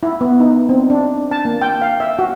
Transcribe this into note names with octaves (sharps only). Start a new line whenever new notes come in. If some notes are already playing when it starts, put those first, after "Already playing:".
E4
B3
D#4
C4
D4
A5
A#3
G5
F5
E5
F#4